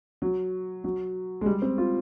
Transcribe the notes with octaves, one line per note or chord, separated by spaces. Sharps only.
F#3
F#3
G#3
G3
C4
F4